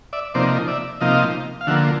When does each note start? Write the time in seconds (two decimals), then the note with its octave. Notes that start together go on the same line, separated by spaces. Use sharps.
0.13 D5 E5
0.34 C3 F3 A#3 D#4 C5 D5
0.67 D5 E5
1.01 C3 F3 A#3 D#4 D#5 F5
1.61 F5
1.67 D3 F3 A#3 E5 F#5